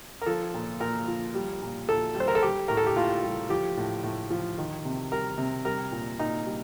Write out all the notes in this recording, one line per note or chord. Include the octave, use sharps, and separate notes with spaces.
A#4
F3 A4
A#2
A#2 A#4
F3
G3
A#2
A#2 A4
G3
C5
A#4
A4
G3 G4
A2 A#4
A4
G4
A2 F4
G3
F3 G4
A2
A2
F3
D#3
C3
G3 A#4
C3
G3 A#4
A#2
A#2 D#4
G3